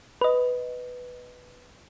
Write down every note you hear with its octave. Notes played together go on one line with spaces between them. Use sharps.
B4 D#5